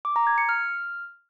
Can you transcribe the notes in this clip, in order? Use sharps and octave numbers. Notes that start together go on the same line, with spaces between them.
D6
A#5
G#6
C#7
F6